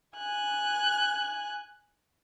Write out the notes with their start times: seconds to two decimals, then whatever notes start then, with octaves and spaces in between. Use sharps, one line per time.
0.17 G#5 F#6